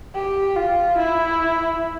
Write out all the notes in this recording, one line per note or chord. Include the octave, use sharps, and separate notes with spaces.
G4
F4
E4